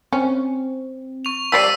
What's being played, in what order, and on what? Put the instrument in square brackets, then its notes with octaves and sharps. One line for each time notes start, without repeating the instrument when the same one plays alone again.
[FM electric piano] C4 [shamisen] C#4
[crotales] C#6 F7
[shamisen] F3 G3 D5 [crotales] E6 C7 D#7 [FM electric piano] A6 B6